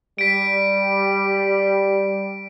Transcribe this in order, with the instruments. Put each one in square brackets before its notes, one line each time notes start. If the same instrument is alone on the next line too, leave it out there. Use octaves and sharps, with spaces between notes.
[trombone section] G3 [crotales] B6 D7